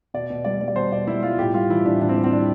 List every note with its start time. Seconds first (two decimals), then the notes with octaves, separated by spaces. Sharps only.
0.14 B2 D5
0.30 B2
0.45 G3 D5
0.61 G3
0.68 D5
0.76 B2 C5
0.92 B2 D5
1.07 G3 E4
1.23 G3 F4
1.39 A2 G4
1.54 G3 F4
1.70 E3 E4
1.86 A2 D4
2.01 A2 D4
2.09 C4
2.17 G3
2.24 C4
2.33 E3 D4